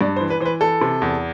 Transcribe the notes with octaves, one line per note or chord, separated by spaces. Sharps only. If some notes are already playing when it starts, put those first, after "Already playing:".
G2 D5
C5
E3
B4
E3 C5
B4
E3 A4
C3
E2